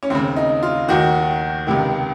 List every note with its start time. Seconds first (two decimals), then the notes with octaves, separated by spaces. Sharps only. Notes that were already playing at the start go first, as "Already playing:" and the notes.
0.03 C#4
0.10 D#2 C#3 C4
0.36 D#4
0.63 F4
0.88 D#2 D#3 F#4
1.67 C#2 C3 D#3